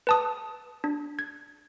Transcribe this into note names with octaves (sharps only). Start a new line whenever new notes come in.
B4 A5 D#6
D4
G#6